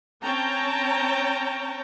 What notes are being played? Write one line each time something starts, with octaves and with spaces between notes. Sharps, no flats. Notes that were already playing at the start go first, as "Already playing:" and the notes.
C4 C#4 C#5 G5 A5 A#5